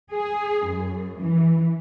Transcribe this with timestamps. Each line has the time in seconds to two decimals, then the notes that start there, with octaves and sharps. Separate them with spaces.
0.12 G#4
0.66 F#2
1.21 E3